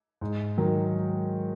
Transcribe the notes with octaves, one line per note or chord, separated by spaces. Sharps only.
G#2
D#3 F#3